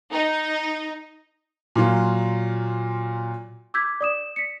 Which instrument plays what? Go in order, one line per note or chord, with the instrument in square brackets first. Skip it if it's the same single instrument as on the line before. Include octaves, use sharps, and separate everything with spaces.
[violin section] D#4
[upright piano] A#2 F#3 F4
[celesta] D6 E6 G6 G#6 B6
D5 D#6 E7
B6 C#7